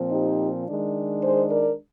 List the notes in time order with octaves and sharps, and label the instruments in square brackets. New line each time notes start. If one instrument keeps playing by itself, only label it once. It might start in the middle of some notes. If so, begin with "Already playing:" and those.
Already playing: [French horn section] A#2 F3 C4
D#4 G4
D#3 G#3 D4
G#4 C5
A#4 D5